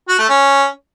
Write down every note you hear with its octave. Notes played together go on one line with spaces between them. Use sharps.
F#4
A3
C#4